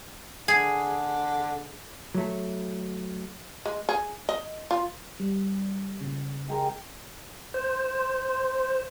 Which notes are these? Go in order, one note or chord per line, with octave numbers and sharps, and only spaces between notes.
D3 G#4
F#3 A3
G#3
G#4
D#5
F4
G3
A#2 C#3
G#3 G4 A#4
C5